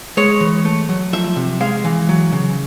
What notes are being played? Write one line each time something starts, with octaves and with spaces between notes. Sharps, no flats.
G#3 C#5
E3
A3
F#3
F3 E5
C3
G#3 F5
E3
F#3
C#3